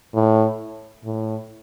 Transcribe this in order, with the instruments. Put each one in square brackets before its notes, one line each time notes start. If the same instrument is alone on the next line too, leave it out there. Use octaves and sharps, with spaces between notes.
[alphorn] A2
A2